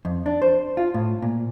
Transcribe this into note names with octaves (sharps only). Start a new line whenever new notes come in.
F2
D4
C5
F4
A2
A#2